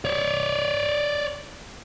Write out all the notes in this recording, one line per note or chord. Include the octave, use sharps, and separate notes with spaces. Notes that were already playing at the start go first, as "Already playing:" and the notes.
C#5 D5